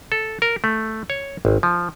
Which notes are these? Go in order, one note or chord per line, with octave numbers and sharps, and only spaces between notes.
A4
A#4
A3
C#5
G#1
F3